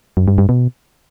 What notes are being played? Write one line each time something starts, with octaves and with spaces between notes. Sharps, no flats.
F#2
G2
G2
B2